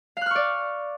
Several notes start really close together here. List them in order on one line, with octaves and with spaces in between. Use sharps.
F5 F#6 F6 C#6 D5